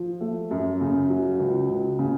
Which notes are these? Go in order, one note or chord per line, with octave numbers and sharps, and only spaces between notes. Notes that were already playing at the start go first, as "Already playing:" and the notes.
Already playing: F3
A3
F#2
C#3
F#3
C#2
C#2
C#3